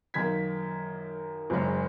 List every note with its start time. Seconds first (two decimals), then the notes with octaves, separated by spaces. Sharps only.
0.14 F#2 D#3 A#3 G#6 B6
1.50 F#1 F#2 C#3 G#3